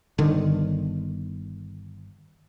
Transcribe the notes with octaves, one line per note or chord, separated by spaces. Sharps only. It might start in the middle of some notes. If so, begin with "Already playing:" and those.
G1 D3 D#3